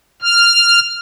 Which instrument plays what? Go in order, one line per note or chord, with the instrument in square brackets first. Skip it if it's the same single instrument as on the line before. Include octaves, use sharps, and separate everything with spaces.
[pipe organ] F6